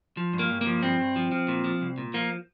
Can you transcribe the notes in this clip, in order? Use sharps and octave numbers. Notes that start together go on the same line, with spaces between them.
F3
G2
A#3
G2
A#3
F3
G2 C4
G2
F3
F3
A#2
F3
C2
A#2
F3 A#3